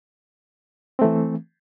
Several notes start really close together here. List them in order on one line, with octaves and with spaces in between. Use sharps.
C4 A3 E3